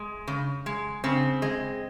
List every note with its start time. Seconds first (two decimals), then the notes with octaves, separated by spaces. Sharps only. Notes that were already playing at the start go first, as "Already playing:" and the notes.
Already playing: G#3
0.27 C#3
0.66 G#3
1.04 C#3 C4
1.42 G#3